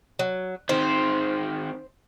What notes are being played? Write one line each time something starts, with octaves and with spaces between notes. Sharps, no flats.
F#3
D#3 C4 C5